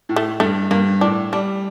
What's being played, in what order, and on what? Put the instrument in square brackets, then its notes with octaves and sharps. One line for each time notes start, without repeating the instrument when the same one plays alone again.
[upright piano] A2
[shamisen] A3
[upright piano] G2 [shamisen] A3
[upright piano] G2 [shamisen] A#3
[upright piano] A2 [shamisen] D4
[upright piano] G3 [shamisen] D4